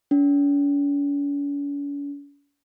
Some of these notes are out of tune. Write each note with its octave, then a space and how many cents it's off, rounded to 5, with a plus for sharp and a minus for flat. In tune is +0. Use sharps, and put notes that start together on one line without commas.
C#4 +45